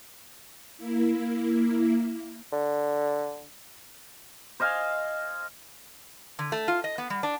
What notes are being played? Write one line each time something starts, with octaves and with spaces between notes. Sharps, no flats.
A#3 E4
D3
C5 D#5 F5 G#5
D3
A3
F4
D#5
B3
G3
D4